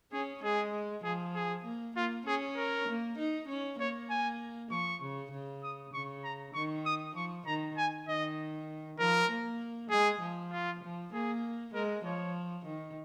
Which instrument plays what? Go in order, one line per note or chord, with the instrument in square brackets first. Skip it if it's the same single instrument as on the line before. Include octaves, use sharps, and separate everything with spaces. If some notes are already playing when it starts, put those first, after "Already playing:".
[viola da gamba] C#4 [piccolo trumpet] G#4
[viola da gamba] G#3 [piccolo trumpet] G#4
[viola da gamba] F3 [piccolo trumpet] G#4
[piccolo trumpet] G#4
[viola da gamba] A#3
[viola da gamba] A#3 [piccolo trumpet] F4
[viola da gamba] C#4 [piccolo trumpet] G#4
[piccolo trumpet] A#4
[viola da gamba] A#3
D#4
C#4
[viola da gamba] A#3 [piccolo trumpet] C#5
[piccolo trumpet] G#5
[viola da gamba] F3 [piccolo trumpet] C#6
[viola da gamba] C#3
C#3
[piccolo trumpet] D#6
[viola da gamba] C#3 [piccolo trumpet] C#6
[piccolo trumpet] A#5
[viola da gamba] D#3 [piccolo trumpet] C#6
[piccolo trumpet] D#6
[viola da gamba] F3 [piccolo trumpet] C#6
[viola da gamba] D#3 [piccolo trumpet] A#5
[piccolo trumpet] G#5
[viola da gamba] D#3 [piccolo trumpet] D#5
[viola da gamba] F3 [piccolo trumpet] A#4
[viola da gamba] A#3
[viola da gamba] G#3 [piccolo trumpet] G#4
[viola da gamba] F3
[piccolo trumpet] F4
[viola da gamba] F3
[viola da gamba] A#3 [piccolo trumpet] G#4
[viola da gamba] G#3 [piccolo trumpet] A#4
[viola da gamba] F3 [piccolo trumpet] C#5
[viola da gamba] D#3